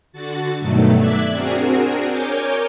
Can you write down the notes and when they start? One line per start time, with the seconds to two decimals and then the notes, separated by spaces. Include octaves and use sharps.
0.12 D3 F#4 A6
0.59 G2 B2 D#3 F#3 A3
0.96 D5 E5 D6 F#6 G#6 B6
1.31 C4 D4 F#4 G#4 A#4
2.08 A#4 C#5 G#5 D6 G6